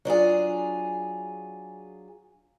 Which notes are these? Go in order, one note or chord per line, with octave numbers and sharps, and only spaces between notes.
F#3 D4 F4 G#4